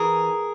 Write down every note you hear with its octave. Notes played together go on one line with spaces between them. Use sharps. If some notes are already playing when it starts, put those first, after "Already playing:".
Already playing: E3 G#4 A#4